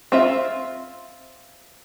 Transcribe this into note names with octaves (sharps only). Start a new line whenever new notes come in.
C4 F4 E5